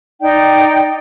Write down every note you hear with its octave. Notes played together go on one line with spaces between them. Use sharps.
D#4 D5 G5